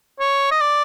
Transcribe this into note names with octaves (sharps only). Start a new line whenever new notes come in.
C#5
D#5
D5